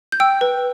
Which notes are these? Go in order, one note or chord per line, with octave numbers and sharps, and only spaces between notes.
G6
G5 E6
B4